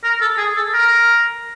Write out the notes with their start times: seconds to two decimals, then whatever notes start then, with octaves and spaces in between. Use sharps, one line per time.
0.04 A#4
0.21 A4
0.38 G#4
0.56 A4
0.74 A#4